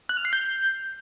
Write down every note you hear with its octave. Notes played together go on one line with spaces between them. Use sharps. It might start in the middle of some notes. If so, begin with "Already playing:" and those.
F#6
F6
C7
G6